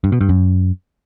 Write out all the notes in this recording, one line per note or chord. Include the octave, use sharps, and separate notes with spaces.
G2
B2
G2
F#2